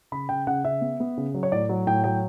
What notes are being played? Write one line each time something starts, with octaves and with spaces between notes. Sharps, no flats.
C#3 B5
C#3 G5
C#3 F#5
C#3 E5
B3
B3
C#3
F#3
C#5
A2 D5
F#3
A2 G5
F#3 G5